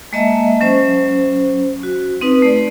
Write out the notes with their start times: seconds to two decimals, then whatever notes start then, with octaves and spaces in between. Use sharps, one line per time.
0.13 G#3 A#3 D#5 E5 A5
0.61 F#3 C#4 C5
1.83 F#4
2.21 C4 D#4 B4
2.42 A3 D5